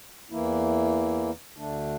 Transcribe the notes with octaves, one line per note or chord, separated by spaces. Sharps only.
E2 E3 A#3 E4
D2 D3 A3 D4